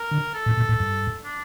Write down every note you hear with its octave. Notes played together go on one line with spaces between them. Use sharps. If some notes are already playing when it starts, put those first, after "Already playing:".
Already playing: A#4
D3
A4
A2
A#2
A2
G2
D4